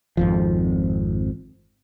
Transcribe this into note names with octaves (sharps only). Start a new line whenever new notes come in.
G#1 F2 F3